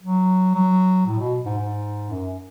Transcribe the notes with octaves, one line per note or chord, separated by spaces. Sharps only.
F#3
F#3
A2
B2
G#2
G#2
F#2